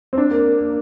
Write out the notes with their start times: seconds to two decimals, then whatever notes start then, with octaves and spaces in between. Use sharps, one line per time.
0.13 C4
0.17 D4
0.31 A#3
0.59 A#3